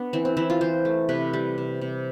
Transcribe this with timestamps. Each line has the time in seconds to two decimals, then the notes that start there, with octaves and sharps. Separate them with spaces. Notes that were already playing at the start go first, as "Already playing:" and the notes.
Already playing: B3 D4
0.13 E3 C4
0.25 C4
0.37 E3 E4
0.50 F4
0.61 E3 C5
0.85 A3
1.09 C3 B4
1.33 G3
1.58 C3
1.81 C3